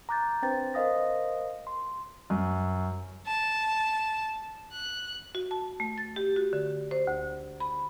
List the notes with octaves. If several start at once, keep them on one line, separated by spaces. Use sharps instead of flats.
A#5 D6 F#6 G6 A6
C4 D4 B4 C5 G5 A6
A#4 C5 D#5 F5 D#6 A#6
C6
F#2
A5
F#6
F#4
A5
A3
A6
G4
F#4
D3
C5
D2
B5